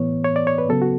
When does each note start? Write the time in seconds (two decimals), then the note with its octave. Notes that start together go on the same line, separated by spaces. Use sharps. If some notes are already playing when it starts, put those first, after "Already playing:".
Already playing: A2 E3 B3 C#5
0.24 C#5
0.36 D5
0.47 C#5
0.58 B4
0.69 C#3 F#3 B3 A4
0.82 F#4